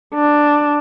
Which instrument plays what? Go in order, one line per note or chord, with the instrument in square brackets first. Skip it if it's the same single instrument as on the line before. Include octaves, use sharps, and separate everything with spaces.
[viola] D4